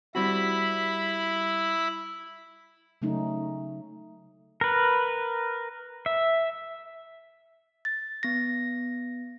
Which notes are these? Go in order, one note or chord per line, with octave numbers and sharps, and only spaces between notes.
G3 C4 E4 F#4 B5
C#3 F#3 A3 C#4 D#4
A#4 B4
E5
A6
B3 A#6